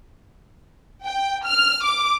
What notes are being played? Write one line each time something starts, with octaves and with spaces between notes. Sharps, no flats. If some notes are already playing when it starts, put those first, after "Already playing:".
G5
F6
D6